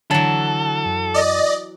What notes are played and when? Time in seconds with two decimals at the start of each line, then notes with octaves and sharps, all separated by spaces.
0.11 D3 E3 F#3 A4 A5 A6
0.86 F#2
1.14 D5 D#5